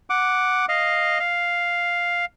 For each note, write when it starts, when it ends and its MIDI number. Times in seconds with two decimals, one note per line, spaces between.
0.10 0.66 78
0.10 0.66 86
0.69 1.19 75
0.69 1.19 77
1.19 2.25 77